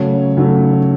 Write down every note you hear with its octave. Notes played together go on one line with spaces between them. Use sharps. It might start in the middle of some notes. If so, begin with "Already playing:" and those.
Already playing: C#3 F#3 A3 C#5
C#3 F#3 A3